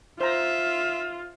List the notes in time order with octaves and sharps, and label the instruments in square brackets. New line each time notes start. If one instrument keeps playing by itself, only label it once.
[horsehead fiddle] F4 [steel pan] C5 A#5 [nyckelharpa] E5